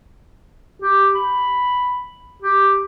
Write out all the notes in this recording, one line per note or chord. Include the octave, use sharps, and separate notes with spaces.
G4
B5
G4